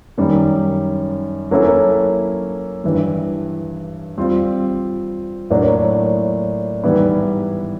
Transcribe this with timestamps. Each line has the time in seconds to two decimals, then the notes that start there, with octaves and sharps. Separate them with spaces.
0.18 F#2 D#3 G3
1.51 F#3 A#3 C#4 E4 A4
2.84 G2 E3 G3
4.18 G3 C4 F4
5.50 A2 F#3 A#3 D4
6.83 G#2 E3 G3 B3 E4